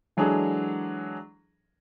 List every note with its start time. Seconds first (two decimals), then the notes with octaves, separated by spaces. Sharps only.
0.17 E3 F#3 G#3 D4 G#4 A4